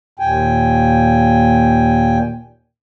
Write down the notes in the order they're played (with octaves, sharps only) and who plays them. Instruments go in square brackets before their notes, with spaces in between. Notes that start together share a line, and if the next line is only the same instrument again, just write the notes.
[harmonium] D#2 A#2 G5 G#5